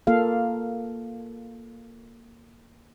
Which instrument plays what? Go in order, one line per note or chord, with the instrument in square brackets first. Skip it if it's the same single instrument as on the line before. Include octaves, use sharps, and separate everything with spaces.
[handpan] A#3 F4 A4 F5